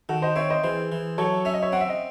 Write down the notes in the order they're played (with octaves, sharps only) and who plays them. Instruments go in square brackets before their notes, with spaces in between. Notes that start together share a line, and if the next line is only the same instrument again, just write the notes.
[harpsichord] D#3 [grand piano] F#4 A4
[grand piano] C5 D#5
[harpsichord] C4 [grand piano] C#5 E5
[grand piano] C5 D#5
[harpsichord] E3 [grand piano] G#4 C5
[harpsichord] E3
[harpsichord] F#3 [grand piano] A4 C#5
[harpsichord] C#4 [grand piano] E5
[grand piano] D#5
C#5 E5
[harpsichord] C4 [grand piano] F#5
[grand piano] E5
D#5